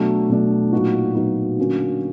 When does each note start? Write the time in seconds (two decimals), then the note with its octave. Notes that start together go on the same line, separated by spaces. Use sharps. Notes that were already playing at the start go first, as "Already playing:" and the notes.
Already playing: B2 F#3 A3 D4
0.29 B2 F#3 A3 D4
0.73 A#2 F#3 B3 D#4 F#4
1.15 A#2 F#3 B3 D#4 F#4
1.58 D3 F#3 A#3 C#4 F#4